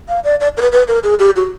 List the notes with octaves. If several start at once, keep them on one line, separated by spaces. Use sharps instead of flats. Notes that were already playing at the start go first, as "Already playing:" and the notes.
F5
D5
D5
A#4
B4
B4
A#4
G#4
G4
F#4